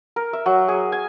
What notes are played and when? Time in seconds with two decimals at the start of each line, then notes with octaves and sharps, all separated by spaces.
0.16 A#4
0.33 E5
0.46 F#3
0.68 G#4
0.92 G#5